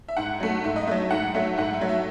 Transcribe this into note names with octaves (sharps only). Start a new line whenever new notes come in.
E5
G#2 F#5
F#3 A3
G#2 E5
D#5
F#3 A3 E5
G#2 F#5
F#3 A3 E5
G#2 F#5
E5
F#3 A3
E5